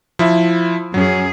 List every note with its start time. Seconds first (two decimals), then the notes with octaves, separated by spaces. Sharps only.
0.19 F3 E4 E5
0.94 F#2 F#3 C#4 G#4